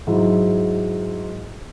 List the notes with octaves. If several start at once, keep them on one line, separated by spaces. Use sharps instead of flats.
G#2 F#3 E4